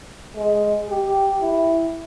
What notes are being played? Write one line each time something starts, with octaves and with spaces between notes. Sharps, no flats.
G#3
G4
E4